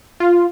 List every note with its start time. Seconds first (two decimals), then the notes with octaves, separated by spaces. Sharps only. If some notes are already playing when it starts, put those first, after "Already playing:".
0.20 F4